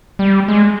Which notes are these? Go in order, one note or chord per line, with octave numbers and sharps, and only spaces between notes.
G3
G#3